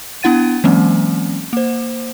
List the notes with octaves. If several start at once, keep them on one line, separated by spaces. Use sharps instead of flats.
B3 D4 E4 F#5 A6 D#7
E3 F#3 G#3 A#3 C4 C#4
A#3 C5